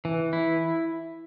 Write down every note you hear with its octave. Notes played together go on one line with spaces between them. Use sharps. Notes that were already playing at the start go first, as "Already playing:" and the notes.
E3
E4